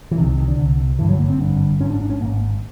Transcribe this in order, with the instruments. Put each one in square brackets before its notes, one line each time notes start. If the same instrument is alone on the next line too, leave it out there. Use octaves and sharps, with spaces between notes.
[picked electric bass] E3
C2 C3 D#3
D#3
D3
C2 C3
G#1 G2 D3 E3
F#3
A#3
C4
G#1 G2 D3
G#2 C#4
G#1
D4
D4
C#4
G#1 G#2 A#3